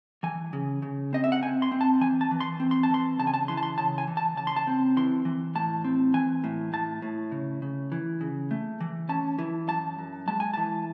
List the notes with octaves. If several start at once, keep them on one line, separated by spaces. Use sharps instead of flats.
E3 G#5
C#3
C#3
C4 D#5
E5
F#5
C4 G#5
C6
C4
A5
E3 G#5
A5
E3
C6
C4
C6
A5
E3 C6
C#3 A5
G#5
A5
E3 C6
A5
C6
C#3 A5
G#5
E3
A5
C#3 A5
C6
A5
C4
E3 C6
E3
A2 A5
C4
E3 G#5
A2
A2 A5
A2
C#3
C#3
E3
C#3
A3
E3
C#4 A5
E3
F#2 A5
F#2
G#3 A5
G#5
E3 A5